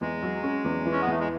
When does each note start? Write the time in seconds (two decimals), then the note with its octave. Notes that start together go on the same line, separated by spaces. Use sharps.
0.01 E2 G#3
0.22 F#3
0.43 C#4
0.64 E2
0.85 E3
0.92 C#4
1.02 B3
1.07 E2 A3
1.19 G#3